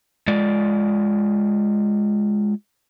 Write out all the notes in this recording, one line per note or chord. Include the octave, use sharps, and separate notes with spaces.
G#3 F4 D5